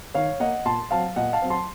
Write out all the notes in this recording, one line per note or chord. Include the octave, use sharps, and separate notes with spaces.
D#3 C#5 F5
A#3 D#5 F#5
A#2 A5 C6
F#3 C4 F5 A5
A#2 D#5 F#5
F5 A5
F#3 C4
A5 C6